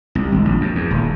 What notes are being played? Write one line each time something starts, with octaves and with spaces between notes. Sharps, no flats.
C2
G#1
A#1
F#2
E2
D#1